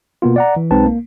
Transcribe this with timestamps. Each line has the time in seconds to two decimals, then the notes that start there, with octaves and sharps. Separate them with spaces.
0.22 B2 A#3 B3 F4
0.36 D5 F#5 A#5
0.56 E3
0.71 B1 G#3 C4 D#4 B4 A5
0.86 A#3